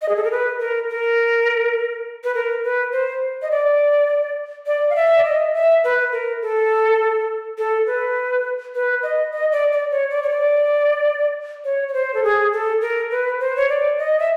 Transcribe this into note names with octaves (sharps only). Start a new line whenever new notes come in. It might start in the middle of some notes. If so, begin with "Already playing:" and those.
D#5
G#4
A4
A#4
B4
A#4
A#4
B4
A#4
B4
C5
D#5
D5
D5
F5
E5
D5
D#5
E5
B4
A#4
A4
A4
B4
B4
D#5
D#5
D5
D5
C#5
D5
C#5
D5
C#5
C#5
C5
A4
G#4
A4
A#4
B4
C5
C#5
D5
D#5
E5